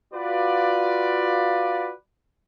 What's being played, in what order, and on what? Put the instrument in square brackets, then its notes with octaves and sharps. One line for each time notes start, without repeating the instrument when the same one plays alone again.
[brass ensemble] F4 F#4 B4 D5